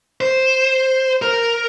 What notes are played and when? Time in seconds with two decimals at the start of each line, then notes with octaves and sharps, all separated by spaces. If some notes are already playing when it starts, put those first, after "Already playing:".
0.21 C5
1.22 A#4